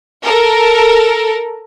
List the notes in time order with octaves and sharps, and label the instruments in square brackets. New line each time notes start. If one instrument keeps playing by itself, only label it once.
[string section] A4 A#4